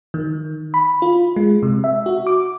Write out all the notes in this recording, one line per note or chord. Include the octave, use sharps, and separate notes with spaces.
D#3
B5
F4
G#3
C3
E5
F#4
D6